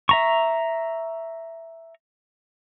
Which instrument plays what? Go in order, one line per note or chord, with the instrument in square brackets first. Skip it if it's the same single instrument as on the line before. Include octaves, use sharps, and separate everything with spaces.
[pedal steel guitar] E5 A#5 C#6